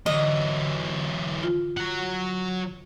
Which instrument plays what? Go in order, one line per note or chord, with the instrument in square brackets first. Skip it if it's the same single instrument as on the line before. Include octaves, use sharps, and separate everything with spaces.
[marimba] D3 [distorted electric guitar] E3 F#3 [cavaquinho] D#5
[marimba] F4
[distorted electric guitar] F#3 F#5